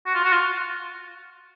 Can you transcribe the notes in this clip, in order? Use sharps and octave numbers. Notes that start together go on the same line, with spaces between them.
F#4
F4
F#4
F4